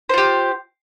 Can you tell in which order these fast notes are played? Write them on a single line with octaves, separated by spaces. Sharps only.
C5 F4 G4